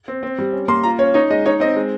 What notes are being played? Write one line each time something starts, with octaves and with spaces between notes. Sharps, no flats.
C4
C4
G3
C#4
A#3 C6
F4 A#5
C#4 C#5
D#4 C#5
G#3 D#5
D#4 C#5
C4 D#5
G#3